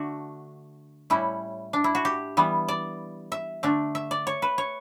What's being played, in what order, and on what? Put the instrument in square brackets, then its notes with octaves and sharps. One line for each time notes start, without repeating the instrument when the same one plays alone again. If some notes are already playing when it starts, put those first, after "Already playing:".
Already playing: [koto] D3 A3 D4 F#4
A2 G3 C#4 E4
D4
E4
F#4
G4
E3 G3 B3
D5
E5
D3 A3 D4
E5
D5
C#5
B4
C#5